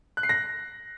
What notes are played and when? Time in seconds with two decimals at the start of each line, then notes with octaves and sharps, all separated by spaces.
0.17 F#6
0.23 C7
0.29 A#6